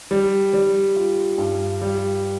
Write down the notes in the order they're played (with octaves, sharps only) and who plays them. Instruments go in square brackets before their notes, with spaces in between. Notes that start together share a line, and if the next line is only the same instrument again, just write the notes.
[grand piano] G3
G3
F4
G2
G3